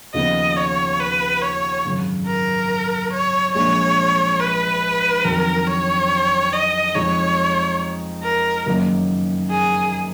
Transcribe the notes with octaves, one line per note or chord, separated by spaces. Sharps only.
D#2 C#3 F3 B3 D#5
C#5
B4
C#5
G#1 F#2 C#3
A#4
C#5
A#1 A#2 G#3 C#5
B4
F2 D#3 F#3 A#4
C#5
D#5
F2 F3 G#3 D#4 C#5
A#4
F#1 F#2 D#3 A#3 D#4
G#4